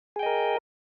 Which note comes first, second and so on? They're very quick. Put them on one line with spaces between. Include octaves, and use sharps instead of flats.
G#4 G5 D#5 A#4